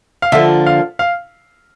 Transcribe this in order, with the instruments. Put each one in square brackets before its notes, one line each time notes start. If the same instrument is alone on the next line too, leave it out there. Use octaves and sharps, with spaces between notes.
[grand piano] F5
[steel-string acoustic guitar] D3 F3 A#3 D4 F4 [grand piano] E5
[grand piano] F5
F5